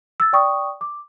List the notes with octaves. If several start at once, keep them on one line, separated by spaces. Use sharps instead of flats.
E6 A6
D5 G5 C#6 D#6
D6